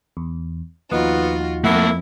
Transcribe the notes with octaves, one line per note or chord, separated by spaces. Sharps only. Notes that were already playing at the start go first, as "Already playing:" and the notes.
E2
D#2 F3 B3 D#4 F4 F#4
F2 A3 A#3 E4 F#5